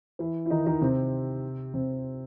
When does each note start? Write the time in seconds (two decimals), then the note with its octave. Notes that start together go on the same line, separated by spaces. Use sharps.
0.19 E3 E4
0.46 E4
0.50 D#3 D#4
0.66 D#3 D#4
0.81 C3 C4
1.74 C3 C4